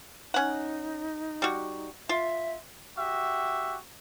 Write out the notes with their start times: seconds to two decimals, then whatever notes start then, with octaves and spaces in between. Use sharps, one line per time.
0.34 C#4 D#4 F#5
1.42 G3 F#4
2.09 F4 E5
2.97 F#4 G4 E5